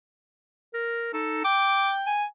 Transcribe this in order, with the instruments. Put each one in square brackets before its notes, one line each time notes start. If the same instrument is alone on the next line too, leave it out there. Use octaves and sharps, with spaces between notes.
[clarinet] A#4
[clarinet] D#4 [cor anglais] A4
[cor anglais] G5 [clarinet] D6
[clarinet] G#5